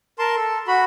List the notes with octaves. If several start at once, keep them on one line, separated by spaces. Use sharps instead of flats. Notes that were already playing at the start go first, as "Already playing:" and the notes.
A#4 A5 C6
A4
F#4 B5